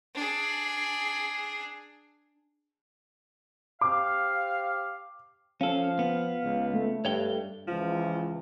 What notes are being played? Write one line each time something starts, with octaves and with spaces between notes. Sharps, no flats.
D4 G#4
G4 C5 F5 D6
F3 C#4 A4 F5
B3
C#2
A3
G2 C#5 F5 G5
C#2 E3 F3